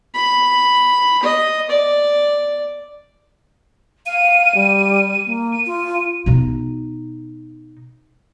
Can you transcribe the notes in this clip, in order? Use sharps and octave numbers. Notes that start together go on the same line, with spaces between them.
B5
D#5
D5
F5 D#7
G3
A#3
D#7
F4
B2 D#4